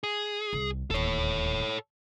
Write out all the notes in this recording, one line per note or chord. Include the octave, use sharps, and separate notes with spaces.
G#4
C2
D1 D#2 A4 C#5